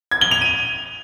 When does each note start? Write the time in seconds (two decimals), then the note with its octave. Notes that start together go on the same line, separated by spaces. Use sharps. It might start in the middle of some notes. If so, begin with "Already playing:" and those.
0.11 G#6
0.21 G7
0.31 F7
0.41 D#7